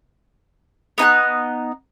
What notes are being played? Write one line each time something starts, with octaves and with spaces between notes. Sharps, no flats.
B3 D#4 G#5 F#6